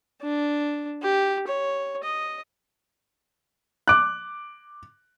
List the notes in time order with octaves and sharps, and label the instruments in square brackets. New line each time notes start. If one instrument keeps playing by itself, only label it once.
[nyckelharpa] D4
G4
C#5
D#5
[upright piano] D6 F#6